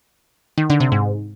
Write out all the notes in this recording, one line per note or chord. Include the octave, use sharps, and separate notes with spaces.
D#3
D3
C3
G#2